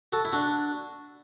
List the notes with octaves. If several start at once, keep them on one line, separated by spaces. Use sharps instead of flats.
F#4 A4
E4
D4 F#4